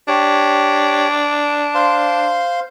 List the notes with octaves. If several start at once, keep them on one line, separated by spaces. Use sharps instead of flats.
D4 G4 C#5
C5 F5 C6